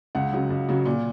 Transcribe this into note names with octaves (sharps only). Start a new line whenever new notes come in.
C#2 F#5
C#3 F#3
C#2
C#3 F#3
A#2